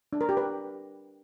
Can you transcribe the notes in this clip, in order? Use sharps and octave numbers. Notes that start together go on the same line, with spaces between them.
D4
A#4
G4
B4